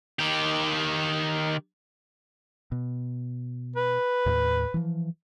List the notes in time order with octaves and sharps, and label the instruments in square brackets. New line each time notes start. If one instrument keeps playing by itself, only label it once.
[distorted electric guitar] D#3 G4
[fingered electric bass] B2
[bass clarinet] B4
[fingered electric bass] D#2 A2
E3 F3